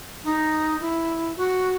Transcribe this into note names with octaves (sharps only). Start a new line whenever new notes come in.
D#4
E4
F#4